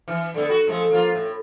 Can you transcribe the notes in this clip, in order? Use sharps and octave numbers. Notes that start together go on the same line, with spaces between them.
E3
D3 A3 B3
F#4
F3 G#3 A3
F3 A#3 F4
A2